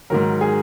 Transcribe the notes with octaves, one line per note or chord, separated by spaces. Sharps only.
G#2 D#3 F#3 A#4
G#4